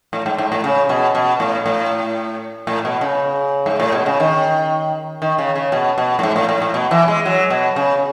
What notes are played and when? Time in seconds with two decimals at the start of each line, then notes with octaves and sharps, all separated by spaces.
0.13 A2
0.26 G#2
0.38 G#2
0.52 A2
0.64 C#3
0.89 B2
1.15 B2
1.40 A2
1.66 A2
2.67 A2
2.85 B2
3.01 C#3
3.66 G#2
3.80 A2
3.93 B2
4.06 C#3
4.20 D#3
5.22 D#3
5.38 C#3
5.55 C#3
5.72 B2
5.98 B2
6.19 A2
6.23 G#2
6.36 A2
6.49 A2
6.62 A2
6.74 B2
6.91 E3
7.08 G#3
7.25 F#3
7.50 B2
7.76 C#3